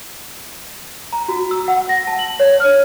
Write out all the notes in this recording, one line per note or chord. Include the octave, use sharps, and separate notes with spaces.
A#5
F#4
E6
F#5
A#6
A5
F#7
C#5
F6